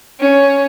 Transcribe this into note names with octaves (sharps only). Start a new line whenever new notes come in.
C#4